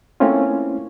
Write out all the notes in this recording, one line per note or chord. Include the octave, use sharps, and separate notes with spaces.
A3 A#3 C4 C#4 E4 F4